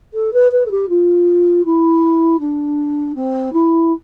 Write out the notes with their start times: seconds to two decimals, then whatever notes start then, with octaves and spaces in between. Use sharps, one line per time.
0.14 A4
0.33 B4
0.52 B4
0.66 A4
0.71 G4
0.89 F4
1.65 E4
2.40 D4
3.15 C4
3.53 E4